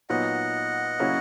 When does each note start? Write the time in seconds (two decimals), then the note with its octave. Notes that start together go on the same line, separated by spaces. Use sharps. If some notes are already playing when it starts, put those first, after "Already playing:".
0.09 A#2 F#3 B3 D#4 D#5 F#5
1.00 C#3 F#3 A#3 C#4 E4